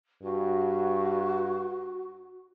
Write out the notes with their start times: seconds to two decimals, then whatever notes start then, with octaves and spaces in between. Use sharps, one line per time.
0.23 G2 F#4